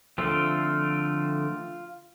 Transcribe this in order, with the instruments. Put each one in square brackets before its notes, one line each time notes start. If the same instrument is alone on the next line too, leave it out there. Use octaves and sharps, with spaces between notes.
[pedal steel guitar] D3 F3 A3 C4 F4